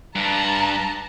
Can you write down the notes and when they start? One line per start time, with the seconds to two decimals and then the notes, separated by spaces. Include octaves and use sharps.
0.15 G2 A5 A#5